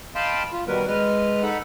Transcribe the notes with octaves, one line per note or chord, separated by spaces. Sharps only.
D#5 F5 G5 A5 B5 C6
F4
B2 D#3 G3 B3 A#4 B4
G#3 B4 D#5 F6
D#4 A4 F#5 B5